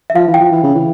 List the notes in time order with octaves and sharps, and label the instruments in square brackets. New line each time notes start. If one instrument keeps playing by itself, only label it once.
[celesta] E5
[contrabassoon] F3 [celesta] F5
[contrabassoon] E3
[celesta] G5
[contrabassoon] F3
E3
C#3
E3